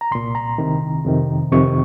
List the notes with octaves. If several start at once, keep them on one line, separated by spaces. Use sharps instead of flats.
A#5
C2 A#2 C6
A#5
C2 C3 D#3
F2 C3 D#3
F2 C3 D#3 C#6